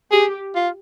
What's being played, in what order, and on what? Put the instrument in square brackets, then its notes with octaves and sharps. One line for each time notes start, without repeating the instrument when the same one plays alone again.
[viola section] G4 [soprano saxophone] G#4
[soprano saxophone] F4